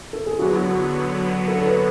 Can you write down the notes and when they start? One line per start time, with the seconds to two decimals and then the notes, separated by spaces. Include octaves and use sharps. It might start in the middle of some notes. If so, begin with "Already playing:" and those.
0.13 A4
0.26 G#4
0.39 D3 F#3 B3 F#4
1.48 A4
1.66 B4